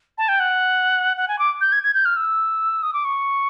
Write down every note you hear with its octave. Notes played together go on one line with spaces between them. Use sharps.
A5
G5
F#5
F#5
G#5
D6
G6
G#6
G#6
G6
F6
E6
D#6
D6
C#6